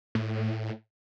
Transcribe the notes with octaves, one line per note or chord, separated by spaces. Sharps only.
A2